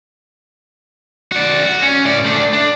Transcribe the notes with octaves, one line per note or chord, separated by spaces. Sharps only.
F#4 D5
F#4
C#4
A2 D5
A3 D4
D4